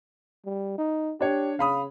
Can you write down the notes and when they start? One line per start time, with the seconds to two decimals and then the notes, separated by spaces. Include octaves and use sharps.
0.45 G3
0.78 D#4
1.21 D4 G4 C#5
1.59 C#3 F5 B5 D#6